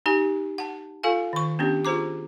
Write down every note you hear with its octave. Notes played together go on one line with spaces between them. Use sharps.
D#4 G4 G#5
F#5 A5
F4 A4 F5 G#5
D#3 C#6
B3 C#4 D4 G4
F4 G#4 C5 A#5 D6